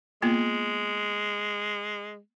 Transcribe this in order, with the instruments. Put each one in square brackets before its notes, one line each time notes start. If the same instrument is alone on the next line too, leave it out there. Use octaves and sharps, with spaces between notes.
[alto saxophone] G#3 [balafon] A#3 B3 F4